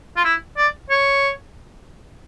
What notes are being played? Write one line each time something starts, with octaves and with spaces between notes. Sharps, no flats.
F4
E4
D5
C#5